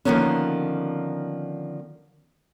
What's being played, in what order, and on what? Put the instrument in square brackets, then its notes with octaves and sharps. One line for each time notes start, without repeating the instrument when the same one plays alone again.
[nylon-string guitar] D3 D#3 F3 A#3 B3 C#4